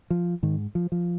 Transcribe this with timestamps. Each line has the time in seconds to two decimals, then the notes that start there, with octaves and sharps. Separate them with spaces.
0.10 F3
0.43 G#2 D#3
0.75 F3
0.92 F3